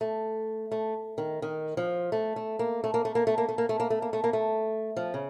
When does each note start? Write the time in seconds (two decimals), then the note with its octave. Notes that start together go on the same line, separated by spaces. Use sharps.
0.01 A3
0.72 A3
1.18 D#3
1.42 D#3
1.77 F3
2.12 A3
2.36 A3
2.59 A#3
2.84 A3
2.94 A#3
3.05 A3
3.15 A#3
3.27 A3
3.38 A#3
3.49 A3
3.58 A#3
3.69 A3
3.80 A#3
3.90 A3
4.02 A#3
4.13 A3
4.24 A#3
4.33 A3
4.97 F3
5.14 C#3